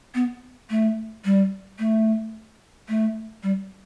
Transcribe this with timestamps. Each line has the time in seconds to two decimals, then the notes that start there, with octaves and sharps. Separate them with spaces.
0.15 B3
0.70 A3
1.25 G3
1.79 A3
2.89 A3
3.43 G3